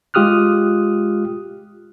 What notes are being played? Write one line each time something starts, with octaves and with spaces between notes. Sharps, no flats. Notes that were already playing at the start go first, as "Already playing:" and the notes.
G#3 F4 G4 D#6 F6 F#6